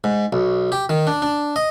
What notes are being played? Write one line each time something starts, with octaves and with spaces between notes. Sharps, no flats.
G#2
B1
G4
D#3
D4
D4
D#5